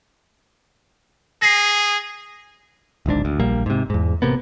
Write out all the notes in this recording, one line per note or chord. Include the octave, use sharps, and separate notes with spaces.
G#4 A#6 C7
D1 G#1 G#2 D4
D2
A#1 G3 A#3
G#2 C3
E2 G#2
A1 C3 A#3 B3